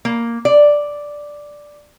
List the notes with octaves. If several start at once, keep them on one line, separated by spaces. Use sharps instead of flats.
A#3
D5